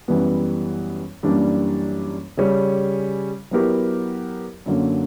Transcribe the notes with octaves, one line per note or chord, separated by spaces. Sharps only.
F#2 E3 G3 B3
F#2 E3 G3 A#3 D4
C#3 G3 C#4
F#3 B3 E4 G4 A#4
F#2 D3 F#3 A#3